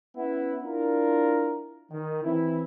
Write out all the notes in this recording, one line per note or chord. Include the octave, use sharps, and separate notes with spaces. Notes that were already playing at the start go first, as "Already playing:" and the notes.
B3 C#4 E4 E5 F#5
D4 E4 F4 A#4
D#3
E3 C4 E4